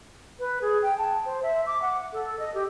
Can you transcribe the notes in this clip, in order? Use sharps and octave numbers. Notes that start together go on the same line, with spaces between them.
B4
G#4
G5
A5
C5
E5
D6
F#5
A4
D#5
G4